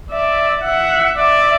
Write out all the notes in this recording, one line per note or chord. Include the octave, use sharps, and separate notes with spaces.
D5 E5
E5 F#5
D5 E5